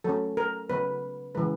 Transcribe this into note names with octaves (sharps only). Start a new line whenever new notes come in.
F#3 A3 C#4 A4
A#4
C#3 F#3 B3 B4
C#3 E3 G#3 B4